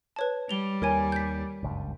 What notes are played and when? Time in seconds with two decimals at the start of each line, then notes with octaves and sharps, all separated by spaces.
0.16 B4 C#5 A5
0.49 G3 F7 G7
0.82 D#2 A#4 C#5 G#5
1.12 G6 B6
1.63 F#1 C#2 G2